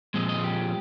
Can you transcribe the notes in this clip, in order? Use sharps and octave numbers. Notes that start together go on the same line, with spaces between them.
A#2 F3 G#3 C4 D#5
D#5
G4